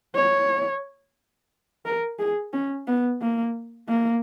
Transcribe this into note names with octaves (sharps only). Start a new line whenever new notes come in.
C#5
A#4
G#4
C#4
B3
A#3
A#3